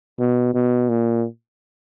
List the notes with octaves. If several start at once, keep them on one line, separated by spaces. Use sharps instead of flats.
B2
B2
A#2